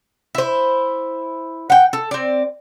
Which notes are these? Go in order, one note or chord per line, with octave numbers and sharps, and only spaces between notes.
E4 C5
F#5 G5
A4
C4 D5